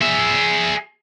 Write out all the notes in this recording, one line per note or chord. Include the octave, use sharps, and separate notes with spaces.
G#4 E5